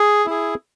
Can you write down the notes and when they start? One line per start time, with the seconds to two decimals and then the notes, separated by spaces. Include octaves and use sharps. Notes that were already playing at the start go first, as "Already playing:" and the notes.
Already playing: G#4
0.26 E4 G#4